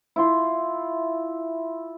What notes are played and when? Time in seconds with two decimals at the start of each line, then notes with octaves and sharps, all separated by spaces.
0.16 E4 F4 C6